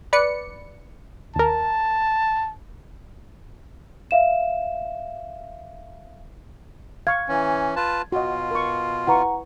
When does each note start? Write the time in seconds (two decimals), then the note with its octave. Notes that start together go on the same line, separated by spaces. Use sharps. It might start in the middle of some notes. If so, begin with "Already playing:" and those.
0.13 B4 D5 C#7
1.36 D#2 A#4 A5
4.11 E5 F5 E7
7.07 F5 C#6 G#6
7.29 E3 C#4
7.76 F4 B4 A5
8.12 B2 F4 F#4 D#5
8.51 A#4 C#6
9.07 E4 B4 F#5 A#5 C#6